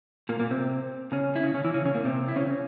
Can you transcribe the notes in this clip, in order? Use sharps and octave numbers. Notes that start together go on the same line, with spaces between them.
A#2 A#3
A#2 A#3
C3 C4
C#3 C#4
E4
C#3 C#4
C#3 C#4
E3 E4
C#3 C#4
C#3 C#4
A#2 A#3
C3 C4
E4
C#3 C#4
C#3 C#4